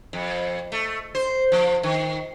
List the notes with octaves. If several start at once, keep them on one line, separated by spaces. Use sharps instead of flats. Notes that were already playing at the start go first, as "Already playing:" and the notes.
F2
A3
C5
F3
D#3